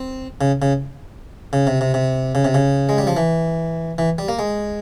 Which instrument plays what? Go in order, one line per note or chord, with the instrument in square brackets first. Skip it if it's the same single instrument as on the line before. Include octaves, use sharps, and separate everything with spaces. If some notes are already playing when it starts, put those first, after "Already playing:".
Already playing: [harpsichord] C4
C#3
C#3
C#3
C3
C3
C3
C#3
C3
C#3
G#3
G3
F3
E3
E3
G3
A#3
G#3